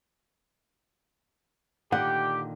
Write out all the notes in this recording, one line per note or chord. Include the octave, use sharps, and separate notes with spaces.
A#2 D3 D#3 G4 F#5 G5